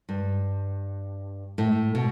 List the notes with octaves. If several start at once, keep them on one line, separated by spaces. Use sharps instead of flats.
G2
A2
B2